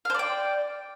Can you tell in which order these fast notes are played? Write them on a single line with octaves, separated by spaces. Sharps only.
F5 C5 D5 G5